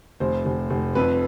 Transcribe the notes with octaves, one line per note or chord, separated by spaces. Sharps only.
F1 C5
F1
F1
F2 B4